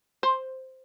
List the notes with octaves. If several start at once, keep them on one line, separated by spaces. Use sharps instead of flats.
C5